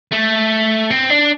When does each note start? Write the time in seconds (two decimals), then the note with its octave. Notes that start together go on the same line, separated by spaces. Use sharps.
0.12 A3
0.90 C4
1.10 D4